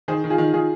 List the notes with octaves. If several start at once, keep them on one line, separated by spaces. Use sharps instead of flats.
D#3 G#4 C5
D#3
F4 G#4
D#3
D#3 F4 G#4